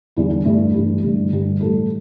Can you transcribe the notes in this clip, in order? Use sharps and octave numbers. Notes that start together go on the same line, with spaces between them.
E2 D3 G3 E4
D4
G2 E3 G3 A3
G2 E3 G3
G2 D3 G3 A3
G2 D3 G3 G4
A2 E3 G3 A4